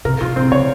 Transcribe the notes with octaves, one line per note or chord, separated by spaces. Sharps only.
C3 A#4
B2 F4
B2 C4
C#3 C#5